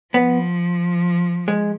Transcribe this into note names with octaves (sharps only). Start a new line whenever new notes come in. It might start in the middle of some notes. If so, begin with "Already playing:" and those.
F3 B3
G#3